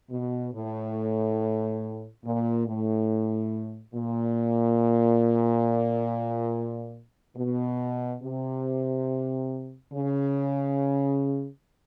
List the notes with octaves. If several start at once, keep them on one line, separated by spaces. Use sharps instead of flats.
B2
A2
A#2
A2
A#2
B2
C3
C#3